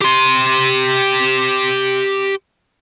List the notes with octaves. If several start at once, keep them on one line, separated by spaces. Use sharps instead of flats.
G4 C6